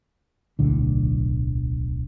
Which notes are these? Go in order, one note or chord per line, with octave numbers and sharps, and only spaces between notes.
D1 B1 A2 D3